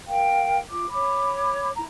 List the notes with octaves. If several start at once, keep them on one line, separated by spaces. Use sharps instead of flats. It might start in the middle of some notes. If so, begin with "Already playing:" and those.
A#4 F5 G5
F4 D6
C#5 B5 D6
E4 A#5